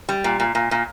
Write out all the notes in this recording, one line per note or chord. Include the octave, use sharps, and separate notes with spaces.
G3
A#2
A#2
A#2
A#2